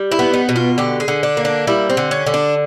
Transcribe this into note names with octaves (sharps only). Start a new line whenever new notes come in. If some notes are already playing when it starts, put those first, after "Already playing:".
Already playing: G3
E4
B3
D#4
B2
F4
D3 G4
G#4
D3
D4
A#3
D4
G3 E4
C4
D3
C#4
D3
D4